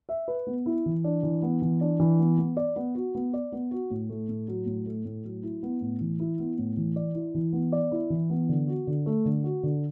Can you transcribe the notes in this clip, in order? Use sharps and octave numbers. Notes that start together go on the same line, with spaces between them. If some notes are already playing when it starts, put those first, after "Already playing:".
E5
B4
B3
E4
E3
D4
E3
B3
E3
D4
E3
B3
B3
D5
B3
F#4
B3
D5
B3
F#4
A2
A3
A2
F#3
A2
A3
A2
F#3
E4
B3
A2
E3
E4
B3
A2
E3
D5
E4
E3
B3
D5
E4
E3
B3
D3
F#4
D3
A3
D3
F#4
D3